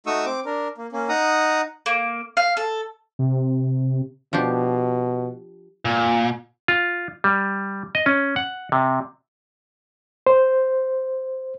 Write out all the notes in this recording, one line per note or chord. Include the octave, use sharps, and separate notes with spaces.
A3 D#4 F#4 C#6 D#6 E6
C4 D6
D4 A#4
A#3
A#3 C#4
D#4 F#5 A#5 D#6
A#3
F5
A4
C3
B2 F3 D4 G4
A#2
F4
G3
D#5
C#4
F#5
C3
C5